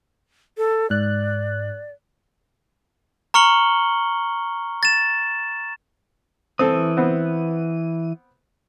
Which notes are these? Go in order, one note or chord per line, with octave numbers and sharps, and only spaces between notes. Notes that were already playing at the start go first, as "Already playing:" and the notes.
A4
G#2 D5 F#6
A#5 C#6 F6 C#7 F#7 G7
A6 E7
E3 C4 A4 D#6
B3 C4